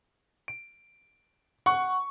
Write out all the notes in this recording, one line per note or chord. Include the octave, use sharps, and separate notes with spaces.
D7
F#5 C#6